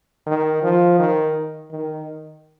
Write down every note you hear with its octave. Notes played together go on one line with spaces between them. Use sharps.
D#3
F3
D#3
D#3